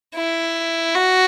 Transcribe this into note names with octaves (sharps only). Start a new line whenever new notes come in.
E4
F#4